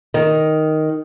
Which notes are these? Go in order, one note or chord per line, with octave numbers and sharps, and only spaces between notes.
D#3